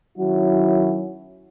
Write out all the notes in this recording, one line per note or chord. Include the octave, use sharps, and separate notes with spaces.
D#3 F#3 C#4 E4 F#4